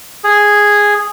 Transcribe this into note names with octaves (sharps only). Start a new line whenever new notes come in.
G#4